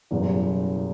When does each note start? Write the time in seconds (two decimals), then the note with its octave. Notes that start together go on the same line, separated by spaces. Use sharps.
0.11 F#1 E2 B2 G3